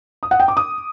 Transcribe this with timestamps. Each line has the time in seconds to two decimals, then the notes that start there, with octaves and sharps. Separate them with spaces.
0.23 D#6
0.31 F#5
0.40 G5
0.48 D6
0.57 D#6